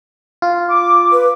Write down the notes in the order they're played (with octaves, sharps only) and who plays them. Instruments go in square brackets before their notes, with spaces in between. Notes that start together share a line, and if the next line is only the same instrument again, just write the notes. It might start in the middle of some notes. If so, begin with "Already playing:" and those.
[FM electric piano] F4
[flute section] D6
[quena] B4